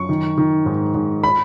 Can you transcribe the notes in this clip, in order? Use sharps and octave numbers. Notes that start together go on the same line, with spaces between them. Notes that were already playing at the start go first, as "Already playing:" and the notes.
Already playing: F#2 C#6
D#3
D#3
G#2
G#2
B5